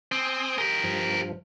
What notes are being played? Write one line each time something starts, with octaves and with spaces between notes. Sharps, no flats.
C4 G#5 C6 D#6
G4 A#4
G2 F3